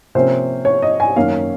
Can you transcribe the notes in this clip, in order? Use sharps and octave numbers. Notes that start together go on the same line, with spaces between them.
C3 F3 A#3 C#4 C5
C#5
D#5
G#5
F#2 D#3 A#3 C#4 F5